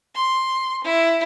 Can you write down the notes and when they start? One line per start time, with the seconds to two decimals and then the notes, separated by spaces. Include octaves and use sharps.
0.15 C6
0.84 E4